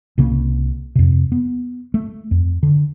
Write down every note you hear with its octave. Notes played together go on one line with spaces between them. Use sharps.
C2 C#3 A#3
F2 C3
B3
A3
F2
D3